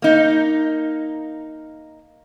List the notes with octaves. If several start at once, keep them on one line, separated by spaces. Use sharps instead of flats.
A#3 D#4